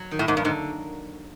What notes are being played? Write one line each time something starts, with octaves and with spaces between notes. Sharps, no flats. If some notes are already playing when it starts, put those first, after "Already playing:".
Already playing: F#3
D#3
A2
G#2 A#3
G2
G#2 D3